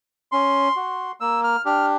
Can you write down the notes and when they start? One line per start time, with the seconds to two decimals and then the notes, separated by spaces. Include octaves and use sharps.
0.32 C#4 C6
0.76 F#4
1.20 A#3 E6
1.44 F6
1.65 D4 G4 F6